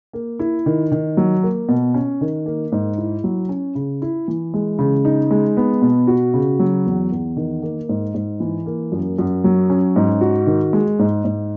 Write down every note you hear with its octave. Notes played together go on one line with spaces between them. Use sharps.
A#3
E4
D#3
D#3
F#3
A#3
B2
C#4
D#3
A#3
G#2
E4
F#3
C#4
C#3
E4
E3
G#3
C#3
D#4
G#3
B3
B2
F#4
C#3
F#3
E2
E2
D#3
A#3
G#2
G#2
E3
A#3
F#2
F#2
F#3
C#4
G#2
F#4
D#3
G#3
G#2
G#2